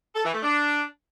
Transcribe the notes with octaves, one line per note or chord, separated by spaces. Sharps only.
A4
E3
A3
D4